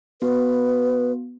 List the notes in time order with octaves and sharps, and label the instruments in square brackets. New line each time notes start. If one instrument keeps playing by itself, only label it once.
[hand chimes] B3 F#4 [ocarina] B4